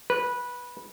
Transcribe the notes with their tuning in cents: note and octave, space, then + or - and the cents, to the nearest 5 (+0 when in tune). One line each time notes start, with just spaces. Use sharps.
B4 -15